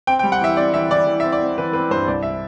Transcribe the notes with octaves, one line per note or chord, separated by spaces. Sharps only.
C4 G5
G5
G3
F#5
E3 E5
C4 D5
E3 E5
E3 D5
E3
E5
C4
D5
C4
E3 B4
C4 B4
G2 C5
C2 D5
E5